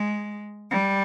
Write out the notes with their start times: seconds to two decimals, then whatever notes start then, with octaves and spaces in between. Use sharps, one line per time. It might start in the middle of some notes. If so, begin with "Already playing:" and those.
Already playing: G#3
0.70 G3